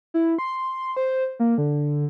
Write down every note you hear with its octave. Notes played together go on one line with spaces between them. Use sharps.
E4
C6
C5
A#3
D3